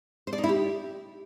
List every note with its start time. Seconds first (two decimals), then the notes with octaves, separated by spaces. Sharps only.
0.27 C5
0.33 D5
0.38 D#4
0.44 E4
0.49 G4